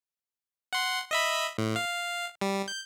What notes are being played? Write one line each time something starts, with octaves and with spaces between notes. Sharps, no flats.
F#5 C6
D#5 E5 B5
A2
F5
G3
G6